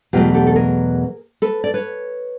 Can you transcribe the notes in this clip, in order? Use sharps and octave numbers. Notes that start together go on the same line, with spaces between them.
E2 B2 F#3 A3 F4 G4
G4 A4
A4
G#4 A#4
A4 B4
D5
B4 C#5